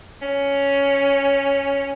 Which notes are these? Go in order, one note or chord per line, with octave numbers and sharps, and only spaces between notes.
C#4